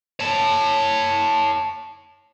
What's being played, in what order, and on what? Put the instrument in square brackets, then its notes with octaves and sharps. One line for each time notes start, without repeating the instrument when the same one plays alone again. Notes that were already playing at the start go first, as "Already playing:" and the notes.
[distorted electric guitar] C#5 A5